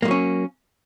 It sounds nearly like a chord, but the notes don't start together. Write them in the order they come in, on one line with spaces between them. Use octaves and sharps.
A#3 G#3 F#3 C#4